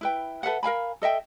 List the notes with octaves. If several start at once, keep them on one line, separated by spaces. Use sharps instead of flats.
E4 B4 G5
A4 B4 E5 F#5
A#4 F5 G#5 B5
A4 D#5 E5 G5